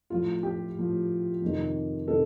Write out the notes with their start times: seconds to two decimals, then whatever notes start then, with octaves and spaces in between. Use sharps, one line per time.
0.10 A2 F3 F4
0.43 G4
0.77 A2 F3
1.41 F2 C3 D#3
2.08 C3 D#3 A4